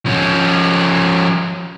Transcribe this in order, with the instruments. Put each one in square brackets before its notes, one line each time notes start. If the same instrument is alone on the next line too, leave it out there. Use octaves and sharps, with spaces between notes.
[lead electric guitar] F3 C#4